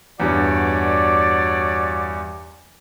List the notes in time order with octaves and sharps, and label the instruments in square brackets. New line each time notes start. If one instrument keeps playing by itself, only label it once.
[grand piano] E2 G2 [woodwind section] F#4 C#5 D5